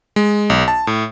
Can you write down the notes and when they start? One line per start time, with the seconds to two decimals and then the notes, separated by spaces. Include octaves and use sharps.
0.16 G#3
0.50 B1
0.68 A5
0.87 A2